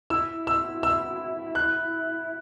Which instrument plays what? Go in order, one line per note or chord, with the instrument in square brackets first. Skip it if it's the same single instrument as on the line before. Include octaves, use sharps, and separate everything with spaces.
[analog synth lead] E4 [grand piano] E6
[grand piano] E6
E6
F#6